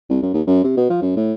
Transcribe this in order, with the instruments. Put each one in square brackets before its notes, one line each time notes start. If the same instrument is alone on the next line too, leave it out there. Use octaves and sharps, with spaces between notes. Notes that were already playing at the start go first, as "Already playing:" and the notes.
[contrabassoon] C2
F#2
D#2
F#2
C3
B2
F3
F#2
A2